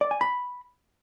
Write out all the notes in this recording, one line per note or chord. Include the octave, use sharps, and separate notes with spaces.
D5
G#5
B5